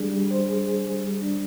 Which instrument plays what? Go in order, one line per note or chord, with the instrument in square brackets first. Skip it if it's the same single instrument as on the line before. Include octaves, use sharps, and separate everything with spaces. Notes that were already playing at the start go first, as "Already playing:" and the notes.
Already playing: [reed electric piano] G3 D4 G#4
G3
C5
G#4
G#4
G3
G3
D4